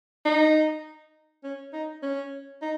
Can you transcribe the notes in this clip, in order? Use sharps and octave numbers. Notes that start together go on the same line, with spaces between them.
D#4
C#4
D#4
C#4
D#4